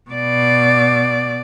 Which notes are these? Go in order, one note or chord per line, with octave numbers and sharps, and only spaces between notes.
B2 D5